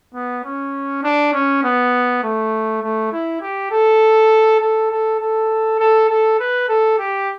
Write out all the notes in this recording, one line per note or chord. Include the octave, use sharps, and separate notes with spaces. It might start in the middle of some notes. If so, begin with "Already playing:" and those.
B3
C#4
D4
C#4
B3
A3
A3
E4
G4
A4
A4
A4
A4
A4
A4
B4
A4
G4